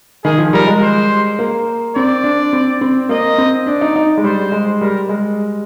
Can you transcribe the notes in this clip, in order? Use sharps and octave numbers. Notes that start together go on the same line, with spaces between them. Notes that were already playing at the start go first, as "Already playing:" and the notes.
D#3 G#4
F3
G3 A#4
G#3
C5
A#3
C4 D5
D4
C4
C4
A#3 D#5
C4
D4 D5
D#4
D#4
G#3
G3 C5
G#3
G3 A#4
G#3